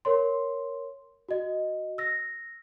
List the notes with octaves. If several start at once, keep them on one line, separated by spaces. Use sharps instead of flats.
A#4 C#5 C6
F#4 D#5
E6 A#6